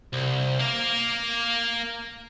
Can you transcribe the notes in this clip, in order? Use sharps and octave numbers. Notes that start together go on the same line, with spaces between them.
C2
A#3 A#4